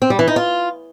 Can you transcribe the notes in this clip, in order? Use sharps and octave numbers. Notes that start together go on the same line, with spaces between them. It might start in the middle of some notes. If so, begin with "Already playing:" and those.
C4
G3
E3
D#4
F4